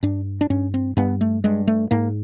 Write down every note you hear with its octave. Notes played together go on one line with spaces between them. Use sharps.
G2 D4
D4
G2 C#4
C4
G2 B3
A3
G2 G#3
A3
G#2 A#3